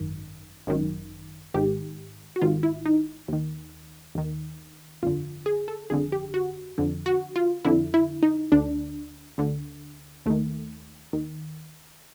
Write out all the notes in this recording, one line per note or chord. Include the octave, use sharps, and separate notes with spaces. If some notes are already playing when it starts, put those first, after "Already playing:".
Already playing: G#1 F#2 D#3
G#1 F#2 D#3
G#1 G#2 D#3 G4
F#4
G#1 G#2 D#3 F4
E4
D#4
D#2 D#3
D#2 D#3
G1 F2 D3 F4
G#4
A4
G1 F2 D3 G#4
G4
F#4
F2 D3
F#4
F4
F2 D3 E4
E4
D#4
D2 D3 D4
D2 D3
D#2 D#3 A3
D#2 D#3